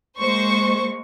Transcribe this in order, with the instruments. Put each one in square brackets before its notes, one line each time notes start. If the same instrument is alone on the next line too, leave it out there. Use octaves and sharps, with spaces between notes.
[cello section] G#3 A#3 [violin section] C5 C#6